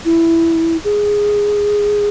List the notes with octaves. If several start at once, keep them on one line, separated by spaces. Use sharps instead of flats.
E4
G#4